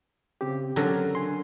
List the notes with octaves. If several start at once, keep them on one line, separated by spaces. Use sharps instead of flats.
C#3 C4 G4
D3 F#3 C#4 A4 A#4 A#5
G#5 C6